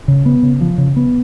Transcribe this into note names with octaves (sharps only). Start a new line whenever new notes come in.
C#3
B3
C#3
F3
C#3
B3